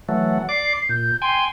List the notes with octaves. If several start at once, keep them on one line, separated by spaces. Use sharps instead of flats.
E3 F#3 A3 F#5
D5 D6 C7
A#2 G6
G5 G#5 C6